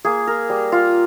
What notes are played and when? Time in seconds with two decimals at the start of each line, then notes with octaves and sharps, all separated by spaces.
0.05 A#3 G#4
0.27 A#4
0.49 G3
0.72 F4